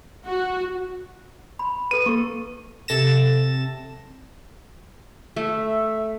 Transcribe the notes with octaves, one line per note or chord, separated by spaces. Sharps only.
F#4
B5
A4 B4 D#7
A#3 A4 C#6
C3 A4 A6 A#6 E7
A3 E5